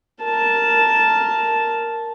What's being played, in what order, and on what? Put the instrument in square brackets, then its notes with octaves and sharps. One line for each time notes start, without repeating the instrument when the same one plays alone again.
[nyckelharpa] A#4 A5